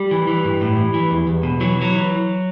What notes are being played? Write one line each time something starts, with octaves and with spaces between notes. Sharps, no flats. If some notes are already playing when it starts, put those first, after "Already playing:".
Already playing: G3
E3
E3
G2
A2
E3
E3
E2
E2
B2
E3 F#3
E3 F#3
E3